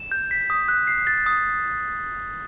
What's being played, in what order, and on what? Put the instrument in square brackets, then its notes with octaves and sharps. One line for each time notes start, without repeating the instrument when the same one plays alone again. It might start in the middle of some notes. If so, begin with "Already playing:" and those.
Already playing: [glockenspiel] E7
G6
B6
D#6
F#6
C7
A6
D#6